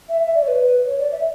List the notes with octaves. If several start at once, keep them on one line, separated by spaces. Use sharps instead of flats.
E5
E5
D5
C#5
B4
C#5
D5
E5